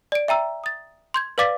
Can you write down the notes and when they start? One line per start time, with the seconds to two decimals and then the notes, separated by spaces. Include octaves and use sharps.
0.12 D5 D7
0.28 E5 G5 A#5 E6
0.64 D#6 A6
1.14 C6 G6 G#6
1.38 B4 D5 F5 D6 A6 B6